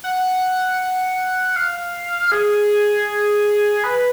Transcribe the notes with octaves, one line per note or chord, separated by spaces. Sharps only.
F#5
F5
G#4
B4